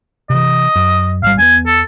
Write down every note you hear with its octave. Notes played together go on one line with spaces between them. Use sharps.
C3 E3 D#5
F#2
G#1 G3 F5
E2 B3 G#5
A4